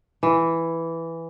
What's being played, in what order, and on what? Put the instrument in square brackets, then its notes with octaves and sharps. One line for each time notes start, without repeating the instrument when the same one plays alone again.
[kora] E3